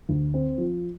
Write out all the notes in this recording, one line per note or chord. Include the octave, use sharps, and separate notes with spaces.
D2
C4
F3